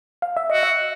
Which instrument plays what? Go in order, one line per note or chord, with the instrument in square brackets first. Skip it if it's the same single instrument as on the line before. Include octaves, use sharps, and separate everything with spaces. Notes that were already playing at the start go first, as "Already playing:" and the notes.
[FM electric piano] F5
E5
[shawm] F#4 [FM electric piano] D#5
[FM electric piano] E5